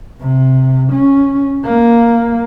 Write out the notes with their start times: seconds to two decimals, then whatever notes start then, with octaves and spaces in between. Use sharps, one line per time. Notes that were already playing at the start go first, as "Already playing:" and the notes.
0.21 C3
0.92 C#4
1.65 A#3